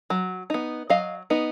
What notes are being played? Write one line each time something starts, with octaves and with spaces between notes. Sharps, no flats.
F#3
B3 D#4
F#3 D#5 F5
B3 D#4